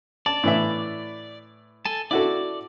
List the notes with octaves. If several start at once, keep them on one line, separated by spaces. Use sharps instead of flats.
D5 A5
A2 E3 E5
A4 G#5 A5
E4 F#4 A4 D5 D6